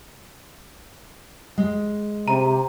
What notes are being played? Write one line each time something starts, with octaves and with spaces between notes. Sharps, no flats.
G#3
C3 A#5